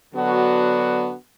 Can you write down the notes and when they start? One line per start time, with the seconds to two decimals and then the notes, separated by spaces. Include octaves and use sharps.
0.14 D3 F#3 B3 D4 F#4